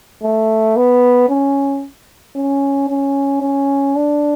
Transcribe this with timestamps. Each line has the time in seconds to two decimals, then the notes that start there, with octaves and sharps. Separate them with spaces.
0.23 A3
0.77 B3
1.30 C#4
2.36 C#4
2.89 C#4
3.42 C#4
3.96 D4